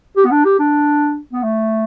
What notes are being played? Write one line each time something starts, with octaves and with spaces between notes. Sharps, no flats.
G4
B3
D4
G4
D4
B3
A3